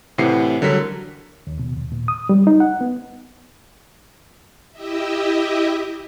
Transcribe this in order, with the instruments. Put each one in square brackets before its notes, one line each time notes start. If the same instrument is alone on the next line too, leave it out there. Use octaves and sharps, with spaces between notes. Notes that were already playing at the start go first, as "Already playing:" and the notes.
[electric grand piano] A2 C3 E3 F#5 C7 C#7
D3 F#3 G3 A#4 B6
[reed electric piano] D#2
B2
D#2
A#2
D#6
G3
D#4
F#5
B3
[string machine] E4 G4 D#5 E5